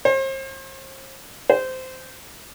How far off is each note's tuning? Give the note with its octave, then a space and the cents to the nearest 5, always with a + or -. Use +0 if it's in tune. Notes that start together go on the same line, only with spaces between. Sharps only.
C5 +40
C5 -15